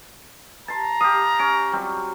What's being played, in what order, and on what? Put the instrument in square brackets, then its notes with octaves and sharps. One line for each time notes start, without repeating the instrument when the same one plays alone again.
[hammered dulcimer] A5 C6 [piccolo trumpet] A#5
[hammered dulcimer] G4 F5 [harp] D#6
[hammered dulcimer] C#4 [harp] D7
[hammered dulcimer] F#3 G3 C4